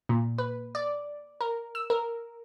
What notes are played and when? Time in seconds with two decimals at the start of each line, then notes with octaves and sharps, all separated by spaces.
0.09 A#2
0.38 B4
0.75 D5
1.41 A#4
1.75 E6
1.90 A#4